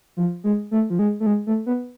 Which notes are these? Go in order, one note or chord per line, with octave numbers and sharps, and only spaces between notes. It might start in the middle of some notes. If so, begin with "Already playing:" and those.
F3
G#3
A3
F3
G#3
A3
G#3
A3
B3